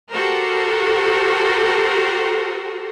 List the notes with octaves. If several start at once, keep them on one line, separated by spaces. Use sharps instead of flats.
F#4 G4 A4 A#4 C5